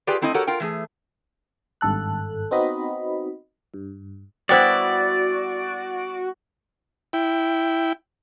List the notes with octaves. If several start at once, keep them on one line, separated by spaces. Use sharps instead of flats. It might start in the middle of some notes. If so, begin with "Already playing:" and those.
F4 G4 G#4 B4 D5 G5
A3 C4 E4 A4 D#5
F#4 G4 A4 A#4 C#5 F#5
F4 A#4 G5
E3 A3 G#4
G#1 G2 A4 F#6
B3 C4 D#4 F#4 D#5 B5
G2
G3 B3 E4 F#4 C5 D5 G5 A6
E4 G5